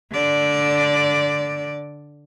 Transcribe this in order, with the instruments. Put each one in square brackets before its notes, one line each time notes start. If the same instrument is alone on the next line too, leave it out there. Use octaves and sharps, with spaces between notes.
[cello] D3 D5